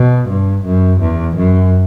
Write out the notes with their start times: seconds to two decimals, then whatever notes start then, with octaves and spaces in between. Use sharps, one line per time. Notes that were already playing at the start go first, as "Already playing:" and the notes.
Already playing: B2
0.29 G2
0.65 F#2
1.00 E2
1.36 F#2